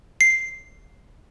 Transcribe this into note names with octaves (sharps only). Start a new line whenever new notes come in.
C7